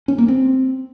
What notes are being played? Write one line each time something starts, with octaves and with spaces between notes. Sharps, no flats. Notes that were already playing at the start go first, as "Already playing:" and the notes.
C#4
A#3
C4